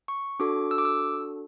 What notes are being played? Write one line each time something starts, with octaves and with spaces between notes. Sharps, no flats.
C#6
D4 F#4 A4 D6
E6
D6
E6